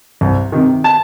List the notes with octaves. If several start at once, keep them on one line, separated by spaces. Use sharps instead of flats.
C2
C3 D#3
A5